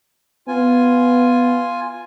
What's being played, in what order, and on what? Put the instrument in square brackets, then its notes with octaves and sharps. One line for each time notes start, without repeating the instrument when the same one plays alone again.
[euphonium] B3 [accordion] F4 G#5